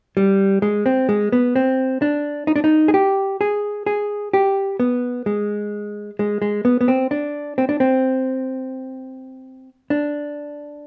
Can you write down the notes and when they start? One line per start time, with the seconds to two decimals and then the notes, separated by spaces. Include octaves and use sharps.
0.17 G3
0.62 G#3
0.86 C4
1.09 G#3
1.32 B3
1.56 C4
2.02 D4
2.47 D#4
2.56 D4
2.64 D#4
2.88 G#4
2.94 G4
3.41 G#4
3.86 G#4
4.33 G4
4.80 B3
5.26 G#3
6.19 G#3
6.42 G#3
6.65 B3
6.81 B3
6.88 C4
7.11 D4
7.58 C4
7.69 D4
7.80 C4
9.90 D4